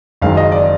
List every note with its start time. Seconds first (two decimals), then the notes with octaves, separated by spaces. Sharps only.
0.22 F#1 F#2 D#3 G#3 F5
0.37 D#5
0.52 D5